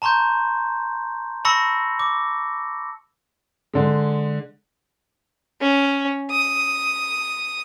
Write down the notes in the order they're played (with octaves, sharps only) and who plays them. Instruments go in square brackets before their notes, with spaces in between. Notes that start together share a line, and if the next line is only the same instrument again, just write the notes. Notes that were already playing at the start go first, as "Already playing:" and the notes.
[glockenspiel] A5 A#5 C6 C#6 G6
A5 B5 C#6 E6 A#6 C#7
D6
[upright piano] D3 G#3
[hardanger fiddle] C#4
D#6